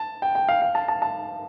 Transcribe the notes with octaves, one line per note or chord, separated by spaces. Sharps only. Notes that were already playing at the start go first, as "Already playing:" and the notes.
Already playing: A5
G5
G5
F5
F5
A5
A5
A5